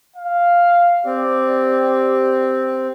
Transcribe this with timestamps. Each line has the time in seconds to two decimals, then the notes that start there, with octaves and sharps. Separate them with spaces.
0.16 F5
1.06 C4 G4 D5